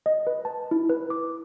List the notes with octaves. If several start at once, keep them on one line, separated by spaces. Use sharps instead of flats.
D#5
B4
A5
E4
B4
D6